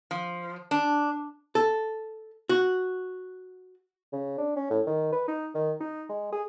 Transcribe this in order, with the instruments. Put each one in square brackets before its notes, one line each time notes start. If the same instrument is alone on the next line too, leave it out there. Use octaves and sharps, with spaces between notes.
[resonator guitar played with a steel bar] F3
D4
[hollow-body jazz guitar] A4
F#4
[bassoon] C#3
D4
C#4
A2
D#3
B4
D#4
D#3
D#4
G#3
G#4